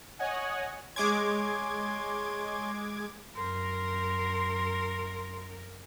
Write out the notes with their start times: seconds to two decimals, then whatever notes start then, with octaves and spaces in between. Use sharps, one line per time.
0.19 C#5 D#5 F#5 G#5
0.96 G#3 C#5 G#5 C6 D6 G#6
3.35 F#2 A#4 C6